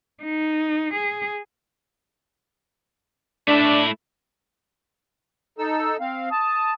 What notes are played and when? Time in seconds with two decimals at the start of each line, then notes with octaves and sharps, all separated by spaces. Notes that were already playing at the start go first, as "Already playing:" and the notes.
0.23 D#4
0.94 G#4
3.48 A3 D4 E4
5.58 D#4 A4 E6
6.00 C4 F5
6.32 A5 D#6